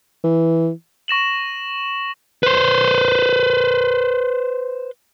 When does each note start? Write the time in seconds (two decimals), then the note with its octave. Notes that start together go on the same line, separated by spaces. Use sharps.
0.24 E3
1.08 C#6 A#6 E7 F#7
2.43 B4 C5